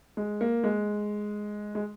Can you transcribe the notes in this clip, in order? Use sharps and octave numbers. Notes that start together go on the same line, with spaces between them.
G#3
A#3
G#3
G#3